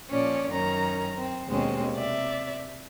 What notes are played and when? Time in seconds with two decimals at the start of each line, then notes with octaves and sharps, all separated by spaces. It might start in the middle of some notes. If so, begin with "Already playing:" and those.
0.11 A#2 F3 C#4 D5
0.50 F#2 D#3 C#4 A#5
1.16 C4
1.48 D#2 B2 G#3 C4 C#4
1.94 C3 D5 E5